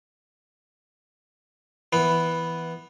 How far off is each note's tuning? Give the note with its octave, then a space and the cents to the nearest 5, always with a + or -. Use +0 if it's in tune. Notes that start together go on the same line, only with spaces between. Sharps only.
E3 +0 B3 +0